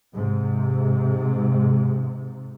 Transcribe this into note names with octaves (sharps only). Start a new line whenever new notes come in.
G#2 C3